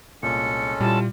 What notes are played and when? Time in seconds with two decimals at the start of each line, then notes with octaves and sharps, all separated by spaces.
0.23 C2 A#2 G#3 C#4 A4 C#7
0.81 A#2 G3 E4 F4 A5